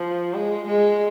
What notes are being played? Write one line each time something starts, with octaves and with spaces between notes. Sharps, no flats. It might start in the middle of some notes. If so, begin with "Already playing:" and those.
Already playing: F3
G#3
G#3